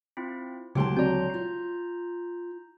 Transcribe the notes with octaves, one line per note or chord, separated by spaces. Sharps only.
C4 E4 F4
D2 C#3 F#3 G#3 G4 G5 A5 C6
C4 F#4 D5 A#5 G6
F4